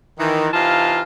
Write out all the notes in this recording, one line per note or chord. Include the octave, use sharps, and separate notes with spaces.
D#3 E3
C3 E3 D#4 F4 F5 A5